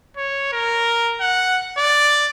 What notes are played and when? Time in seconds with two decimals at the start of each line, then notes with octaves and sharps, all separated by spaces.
0.17 C#5
0.53 A#4
1.21 F#5
1.78 D5